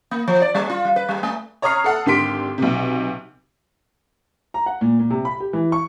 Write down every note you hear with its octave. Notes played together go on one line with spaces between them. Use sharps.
A#3
F3
D5
G3
F4
G3
B4
G3
A3
C#5 A#5 C#6 D#6 F6 C7
A4 F#5
G#1 D3 G4 C6 B6 D7
B1 C3
A#5
F#5
A#2
A#2
C3
B5
G4
E3
C#6